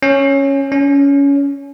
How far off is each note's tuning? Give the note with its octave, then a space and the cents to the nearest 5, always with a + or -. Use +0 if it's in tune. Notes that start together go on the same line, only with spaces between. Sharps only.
C#4 -5
C#4 +20